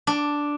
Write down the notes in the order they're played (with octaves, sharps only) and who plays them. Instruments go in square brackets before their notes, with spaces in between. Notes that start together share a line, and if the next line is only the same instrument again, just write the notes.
[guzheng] D4